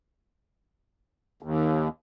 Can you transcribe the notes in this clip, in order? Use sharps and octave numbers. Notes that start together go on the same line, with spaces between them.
D#2